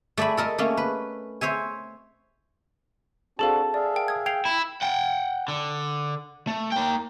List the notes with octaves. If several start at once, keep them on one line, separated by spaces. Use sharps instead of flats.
A3 D5 E5 G#5 B5
A4 A#4 D#5 E5
A3 A#3 C#4
B4
C5 C#5 E5 G#5
C4 D4 F#4 G#4 A4 F5 A5
G#4 D5 E5 F5
A#4 G5 D7
D#6 G#6
G5 G#6 C7 F7
E4
F#5 G5
D3
A3
A#3 G5